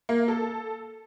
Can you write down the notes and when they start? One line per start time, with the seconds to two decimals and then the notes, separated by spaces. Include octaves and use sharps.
0.09 A#3
0.28 A4